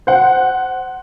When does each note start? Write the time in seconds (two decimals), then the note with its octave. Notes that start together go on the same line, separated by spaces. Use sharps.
0.07 C5 F#5